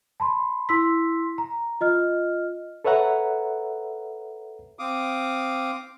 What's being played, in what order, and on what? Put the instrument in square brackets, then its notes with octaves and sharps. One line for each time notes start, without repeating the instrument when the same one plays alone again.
[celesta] A5 B5 C6
E4 C6 E6 B6
A#5
F4 D#5 F6
[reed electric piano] A4 B4 C#5 E5 F#5 A#5
[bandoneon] C4 F5 D6 D#6